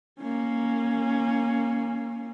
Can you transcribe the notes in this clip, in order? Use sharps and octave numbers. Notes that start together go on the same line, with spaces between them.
A#3 C#4